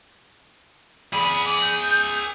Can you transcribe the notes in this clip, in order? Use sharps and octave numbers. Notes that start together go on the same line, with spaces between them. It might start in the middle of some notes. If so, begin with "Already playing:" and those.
G#4 D5 B5
D6
G6